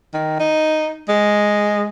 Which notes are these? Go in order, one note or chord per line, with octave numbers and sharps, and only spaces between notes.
D#3
D#4
G#3